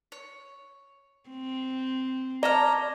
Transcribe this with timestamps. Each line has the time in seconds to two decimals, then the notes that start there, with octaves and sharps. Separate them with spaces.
0.12 C#5
1.30 C4
2.43 C#4 D5 A5 A#5 F6